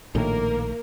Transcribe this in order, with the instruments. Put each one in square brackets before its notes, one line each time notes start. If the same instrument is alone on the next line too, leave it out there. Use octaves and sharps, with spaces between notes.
[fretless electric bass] A#1 A2 D#3 [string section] A#3 A#4